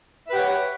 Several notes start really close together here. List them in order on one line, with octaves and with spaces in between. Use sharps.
E5 B4 G4 F#5 C#5